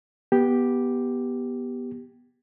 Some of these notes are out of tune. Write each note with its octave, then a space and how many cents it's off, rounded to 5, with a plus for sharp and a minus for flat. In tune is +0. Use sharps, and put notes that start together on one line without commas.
B3 -15 G4 +0